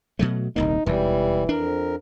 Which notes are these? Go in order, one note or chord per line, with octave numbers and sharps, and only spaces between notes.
B2 F#3 A3
D#1 C2 A#3 D#4
E1 D#2 E3 G3
F2 D4 A#4